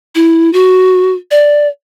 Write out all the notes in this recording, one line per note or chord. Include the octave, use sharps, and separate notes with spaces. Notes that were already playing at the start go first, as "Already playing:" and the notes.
E4
F#4
D5